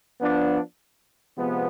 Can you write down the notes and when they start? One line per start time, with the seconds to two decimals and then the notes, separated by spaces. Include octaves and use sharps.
0.20 F3 B3 D4
1.36 C3 F3 G#3 B3